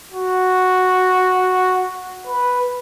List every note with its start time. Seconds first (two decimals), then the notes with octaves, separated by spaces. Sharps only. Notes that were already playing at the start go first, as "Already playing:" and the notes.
0.12 F#4
2.27 B4